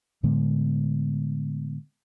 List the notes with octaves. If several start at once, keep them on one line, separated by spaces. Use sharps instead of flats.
A2 D3 G#3 B3